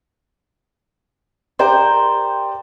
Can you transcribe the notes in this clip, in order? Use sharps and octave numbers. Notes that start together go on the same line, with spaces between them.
G4 A#4 C5 D5 G5